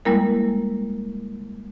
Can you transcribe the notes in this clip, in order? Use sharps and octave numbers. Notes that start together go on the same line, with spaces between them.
G3 G#3 A#3 E4 A#4